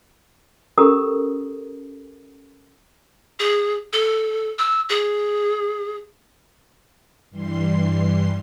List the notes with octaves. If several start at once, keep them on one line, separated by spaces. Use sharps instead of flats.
C#4 G4 A4 A#4 A#5 D#6
G#4
A4
E6
G#4
G2 E3 G3 C6 C7